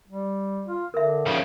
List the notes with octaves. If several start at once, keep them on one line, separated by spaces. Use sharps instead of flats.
G3
F4
D3 A#4 E5
C#3 F3